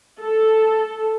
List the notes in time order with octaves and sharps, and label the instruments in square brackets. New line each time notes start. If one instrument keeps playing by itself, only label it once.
[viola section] A4